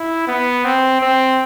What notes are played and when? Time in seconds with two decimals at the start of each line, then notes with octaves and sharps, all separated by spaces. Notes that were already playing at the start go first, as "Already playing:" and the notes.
Already playing: E4
0.28 B3
0.65 C4
1.01 C4